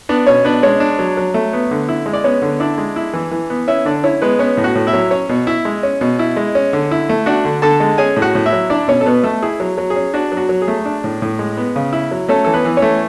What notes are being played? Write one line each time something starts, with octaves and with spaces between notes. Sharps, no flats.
B3 D4 D5
B2 C#4 C#5
B3 D4 B4
G#3 C#4 C#5
D4
F#3
F#3
A3
B3
D3
E4
G#3
D5
B3 C#4 C#5
D3
D4 E4 D5
G#3
E4
E3
E3
B3
C#4 E4 E5
D3 D4 D5
C#4 E4 C#5
G#3 B3 B4
B3 C#4 C#5
A2
F#4 F#5
A2
E4 E5
F#3
C#4 C#5
B2
E4 E5
G#3
C#4
B2
E4
G#3
C#4
D3
E4
A3
D4 F#4 F#5
D3
D3 A4 A5
G#3
C#4 G#4 G#5
A2
F#4 F#5
A2
E4 E5
F#3
D4 E4 D5
B2 C#4 C#5
A4
B2 B3 B4
A3 A4
E4 G#4
F#3
F#3
G#4
C#4
D4 F#4
F#3
F#4
F#3
G#4
A3
D4
A2
A2
G#3
B3
C#3
E4
F#3
A3 C#4 A4
E3 A4
B3 B4
E3
C#4 C#5
A3